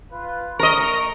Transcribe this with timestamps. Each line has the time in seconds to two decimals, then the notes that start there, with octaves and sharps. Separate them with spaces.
0.12 F4 B4
0.59 A3 A#4 D#5 C#6